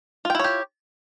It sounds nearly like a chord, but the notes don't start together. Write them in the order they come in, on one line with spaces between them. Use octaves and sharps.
F4 G5 E4 C#5 G4